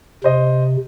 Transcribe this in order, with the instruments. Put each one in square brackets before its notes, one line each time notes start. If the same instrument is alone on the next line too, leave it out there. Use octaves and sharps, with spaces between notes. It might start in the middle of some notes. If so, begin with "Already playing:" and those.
[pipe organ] C3 [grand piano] C5 D#5